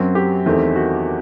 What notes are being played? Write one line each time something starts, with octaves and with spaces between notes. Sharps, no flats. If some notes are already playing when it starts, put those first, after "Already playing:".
Already playing: F#2 F#3 C4
G4
E2 D#3 A3 C4
F#4